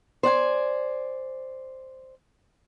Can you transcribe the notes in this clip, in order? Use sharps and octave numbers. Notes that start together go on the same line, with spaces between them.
C5 D5 F#5 G#5